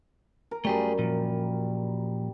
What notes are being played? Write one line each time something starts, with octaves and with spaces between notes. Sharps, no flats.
A#4
F#2 G3 A3 G4 G#4
A#2 F3